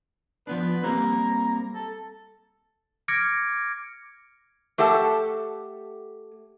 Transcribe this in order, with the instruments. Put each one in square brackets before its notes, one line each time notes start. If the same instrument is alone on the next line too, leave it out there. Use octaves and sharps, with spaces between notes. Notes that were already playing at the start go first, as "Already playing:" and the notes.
[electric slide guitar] F3 B3 D4 [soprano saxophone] B4
[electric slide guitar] G3 A#3 C4 [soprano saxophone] A#5
[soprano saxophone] A4
[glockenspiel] D6 F6 G#6 A#6 C#7 D7
[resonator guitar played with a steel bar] A3 G4 A4 F#5 A5